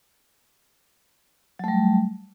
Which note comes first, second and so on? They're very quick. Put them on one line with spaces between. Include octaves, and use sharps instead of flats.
F#3 A3 G3